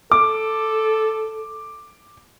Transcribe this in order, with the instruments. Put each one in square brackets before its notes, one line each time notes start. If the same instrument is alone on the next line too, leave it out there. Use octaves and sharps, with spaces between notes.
[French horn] A4 [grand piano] D6